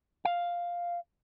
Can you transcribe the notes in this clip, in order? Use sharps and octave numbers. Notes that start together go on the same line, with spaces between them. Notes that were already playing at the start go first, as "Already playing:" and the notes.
F5